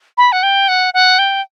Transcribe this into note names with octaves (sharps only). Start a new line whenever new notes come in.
B5
F#5
G5
F#5
F#5
G5